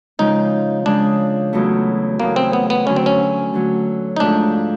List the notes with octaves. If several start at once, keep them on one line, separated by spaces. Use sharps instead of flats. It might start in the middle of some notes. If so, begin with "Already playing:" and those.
C#3 F3 G#3 D#4
C#3 F3 G#3 D4
E2 C#3 F#3 A3
E2 C#3 F#3 A3 A#3
C4
B3
B3
D3 F#3 A3 C#4
C4
C#4
D3 F#3 A3
D#4
G#2 F3 A3 D4